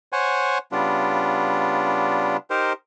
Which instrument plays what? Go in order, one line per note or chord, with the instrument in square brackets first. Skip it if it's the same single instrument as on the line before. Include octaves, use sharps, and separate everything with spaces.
[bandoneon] C5 C#5 F#5 G#5
C#3 G3 B3 D4 F4
D#4 G4 A#4 C5